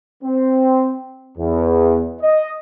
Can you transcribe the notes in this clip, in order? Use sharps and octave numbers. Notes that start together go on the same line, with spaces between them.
C4
E2
D#5